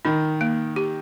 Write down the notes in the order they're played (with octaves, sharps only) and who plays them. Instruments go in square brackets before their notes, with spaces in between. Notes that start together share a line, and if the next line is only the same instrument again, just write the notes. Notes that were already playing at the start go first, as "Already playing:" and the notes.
[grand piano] D#3 [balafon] D#4
[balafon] A#3
G4